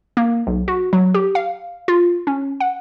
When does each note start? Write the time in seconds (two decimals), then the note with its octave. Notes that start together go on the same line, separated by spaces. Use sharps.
0.17 A#3
0.47 B1
0.68 F#4
0.93 F#3
1.14 G4
1.35 F5
1.88 F4
2.27 C#4
2.60 F#5